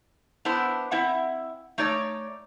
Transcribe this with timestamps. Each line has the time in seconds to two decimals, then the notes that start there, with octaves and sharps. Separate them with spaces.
0.45 B3 D4 E4 C5
0.91 C4 E4 E5 F#5
1.78 A3 D#4 C#5 D5